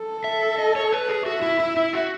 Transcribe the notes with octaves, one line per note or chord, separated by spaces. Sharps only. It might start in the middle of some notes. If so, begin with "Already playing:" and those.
Already playing: A4
E5
D#5
C#5
B4
G#4
F#4 E5
E4
E4
E4
F#4